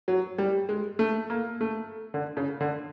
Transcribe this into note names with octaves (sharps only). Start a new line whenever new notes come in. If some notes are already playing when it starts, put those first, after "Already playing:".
F#3
G3
G#3
A3
A#3
A3
D3
C#3
D3